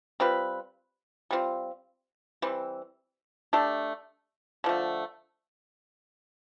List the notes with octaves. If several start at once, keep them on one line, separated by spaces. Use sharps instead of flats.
G3 C4 F4 B4
G3 C4 F4
E3 G3 C4
A3 D4 G4
D3 F3 A3